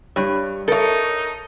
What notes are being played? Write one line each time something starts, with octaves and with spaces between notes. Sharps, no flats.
G2 G3 C#5
D#4 A4 A#4 C#5 E5